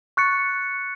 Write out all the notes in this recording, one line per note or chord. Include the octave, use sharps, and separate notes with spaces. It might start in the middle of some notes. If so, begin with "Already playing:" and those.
C#6 F#6 A6 C#7